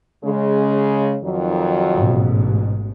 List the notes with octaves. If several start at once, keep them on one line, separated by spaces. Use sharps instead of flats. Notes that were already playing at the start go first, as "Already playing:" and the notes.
C#3 G#3
F2 D#3 F#3
A1 G#2 B2